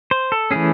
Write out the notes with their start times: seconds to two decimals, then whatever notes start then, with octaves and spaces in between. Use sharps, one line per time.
0.11 C5
0.32 A4
0.51 E3 A3 C#4 G#4